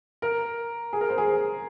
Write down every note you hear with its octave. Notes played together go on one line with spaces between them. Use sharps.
A#4
G#4
A#4
C5
G#4